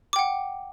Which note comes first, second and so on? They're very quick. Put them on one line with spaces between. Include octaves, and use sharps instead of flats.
D6 G5 F#5